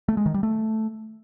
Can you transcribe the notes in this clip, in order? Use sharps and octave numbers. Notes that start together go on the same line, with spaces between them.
A3
G#3
D#3
G3
A3